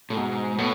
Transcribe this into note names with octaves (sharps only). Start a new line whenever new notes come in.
A2
G#2 B2
A2 B3